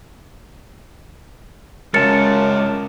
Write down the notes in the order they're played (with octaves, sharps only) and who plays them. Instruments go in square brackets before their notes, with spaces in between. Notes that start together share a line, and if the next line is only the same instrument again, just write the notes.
[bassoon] F#2 [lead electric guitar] C#3 G#3 [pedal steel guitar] A#4 A5 [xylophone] A6 C#7